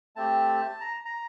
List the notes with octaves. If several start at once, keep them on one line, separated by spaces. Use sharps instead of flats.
A3 C4 G4 A5
A#5
A#5